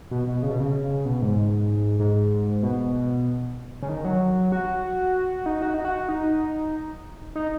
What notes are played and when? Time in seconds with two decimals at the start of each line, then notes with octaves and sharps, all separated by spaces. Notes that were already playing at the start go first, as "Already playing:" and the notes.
0.11 B2
0.27 B2
0.43 C#3
0.51 B2
0.60 C#3
1.05 B2
1.22 G#2
2.00 G#2
2.63 B2
3.82 C#3
3.89 D#3
4.05 F#3
4.52 F#4
5.46 D#4
5.62 F#4
5.74 D#4
5.85 F#4
6.09 D#4
7.35 D#4